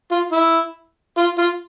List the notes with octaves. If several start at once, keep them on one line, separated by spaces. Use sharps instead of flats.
F4
E4
F4
F4